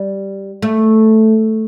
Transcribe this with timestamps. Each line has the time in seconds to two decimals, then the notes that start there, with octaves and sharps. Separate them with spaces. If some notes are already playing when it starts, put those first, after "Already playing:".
Already playing: G3
0.62 A3